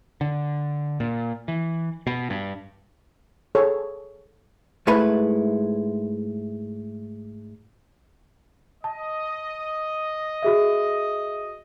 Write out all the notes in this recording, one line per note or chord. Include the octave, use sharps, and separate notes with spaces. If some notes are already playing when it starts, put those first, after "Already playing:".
D3
A#2
E3
B2
G2
G#4 A4 C#5
G#2 G#3 A3 E4 B4
D#5 A5
F#4 G#4 E5